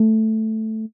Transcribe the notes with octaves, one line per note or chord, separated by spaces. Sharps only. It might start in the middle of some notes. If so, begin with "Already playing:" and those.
Already playing: A3